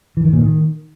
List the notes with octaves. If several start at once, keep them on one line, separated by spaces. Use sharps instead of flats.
E3
D#3
A#2
D#3